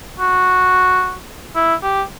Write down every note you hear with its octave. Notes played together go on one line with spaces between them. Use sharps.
F#4
E4
G4